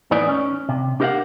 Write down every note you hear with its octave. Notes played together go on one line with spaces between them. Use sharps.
E2 A2 D#4 B4 D5 G#5
C#4
C3
D4 G4 A#4 D5 F5 F#5